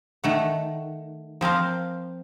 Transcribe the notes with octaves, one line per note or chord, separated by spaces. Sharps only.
D#3 A3 F#5
F3 C4 A#4 F5